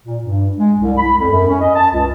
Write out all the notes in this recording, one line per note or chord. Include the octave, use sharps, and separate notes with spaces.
A#2
G2
G#3
C2
B5
F2
F#2
C#4
D#5
A5
C#2